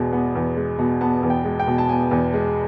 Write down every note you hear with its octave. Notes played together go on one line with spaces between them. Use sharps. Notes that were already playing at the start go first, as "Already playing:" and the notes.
Already playing: E2 B2 G#3
B3
E2
G#3
B2
B3 A5
E2
G5
G#3
G5
B2
A5
B3 G#5
E2
G#3